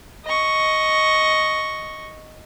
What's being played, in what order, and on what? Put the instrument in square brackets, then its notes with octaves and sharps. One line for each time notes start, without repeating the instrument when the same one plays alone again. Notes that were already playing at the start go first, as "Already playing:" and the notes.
[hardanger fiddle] D#5 C#6